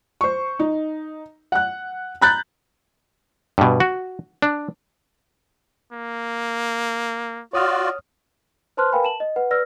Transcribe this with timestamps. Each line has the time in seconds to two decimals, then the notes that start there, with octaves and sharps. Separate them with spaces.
0.21 C5 C#6
0.59 D#4
1.52 F#5 F#6
2.21 A#5 B5 F#6 G6 A6
3.58 G2 B2
3.80 F#4
4.42 D4
5.92 A#3
7.53 F4 F#4 C#5 D5 D#6 F6
8.77 B4 C5 A5 C6 F6 F#6
8.92 A#4 B4 F5 G5 G#5 B5
9.03 A5 E7 F#7
9.20 D#5
9.36 B4 F#5
9.51 B4 D5 E6 F6 A#6